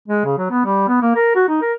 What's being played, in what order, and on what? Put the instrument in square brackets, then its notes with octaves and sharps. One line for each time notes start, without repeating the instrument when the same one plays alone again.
[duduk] G#3
C#3
F#3
B3
G3
B3
A#3
A#4
F#4
D#4
A#4